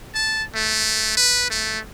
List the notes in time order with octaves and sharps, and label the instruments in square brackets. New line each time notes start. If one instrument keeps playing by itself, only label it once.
[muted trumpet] A5
A3
B4
A3